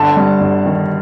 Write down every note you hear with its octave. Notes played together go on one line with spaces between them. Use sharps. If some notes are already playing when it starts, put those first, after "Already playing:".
Already playing: G1 D3 A5
G2
G1
D#3